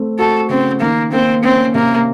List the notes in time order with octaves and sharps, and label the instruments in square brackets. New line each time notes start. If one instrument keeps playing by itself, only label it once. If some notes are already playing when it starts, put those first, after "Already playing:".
Already playing: [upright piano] A3 C4
[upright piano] F#4 [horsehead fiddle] A4
[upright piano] C#3 [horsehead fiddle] C4
[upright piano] D#3 [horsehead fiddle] A#3
[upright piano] A#3 [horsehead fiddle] C4
[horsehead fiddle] C4 [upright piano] C#4
[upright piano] C3 [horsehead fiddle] A#3